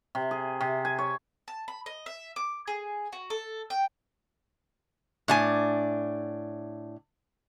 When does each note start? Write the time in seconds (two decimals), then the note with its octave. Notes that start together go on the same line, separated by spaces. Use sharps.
0.15 C3
0.31 G#4
0.61 C3
0.85 G#5
0.98 C#5
1.48 A5
1.68 B5
1.86 D#5
2.06 E5
2.36 D6
2.68 G#4
3.13 F#4
3.30 A4
3.70 G5
5.28 A2 D4 G#5